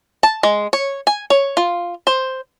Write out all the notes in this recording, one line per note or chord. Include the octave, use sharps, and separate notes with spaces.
A5
G#3
C#5
G#5
C#5
F4
C5